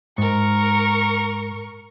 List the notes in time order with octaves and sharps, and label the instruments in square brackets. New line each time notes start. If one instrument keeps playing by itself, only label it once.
[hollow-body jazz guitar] G#2 [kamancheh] A#4 C#6